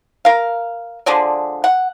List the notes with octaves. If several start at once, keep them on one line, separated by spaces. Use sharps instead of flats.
A#4 F5
D3 F3 G#3 D5
F#5